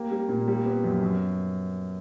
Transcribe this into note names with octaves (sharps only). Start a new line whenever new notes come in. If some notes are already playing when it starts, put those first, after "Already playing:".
Already playing: A#3 G4
G3
A#2
G3
B3
F#2
F#2